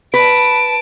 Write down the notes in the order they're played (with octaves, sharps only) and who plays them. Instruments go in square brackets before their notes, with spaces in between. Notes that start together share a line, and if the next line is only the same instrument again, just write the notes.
[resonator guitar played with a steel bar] B4 [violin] A5 D7